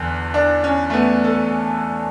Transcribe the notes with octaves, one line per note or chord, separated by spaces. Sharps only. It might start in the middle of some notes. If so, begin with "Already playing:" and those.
Already playing: E2 D3
D4
C#4
A3
B3
A4